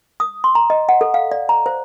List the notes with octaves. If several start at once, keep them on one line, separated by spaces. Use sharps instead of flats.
D#6
C6
A#5
D#5
F#5
A4
F5
D5
A#5
C5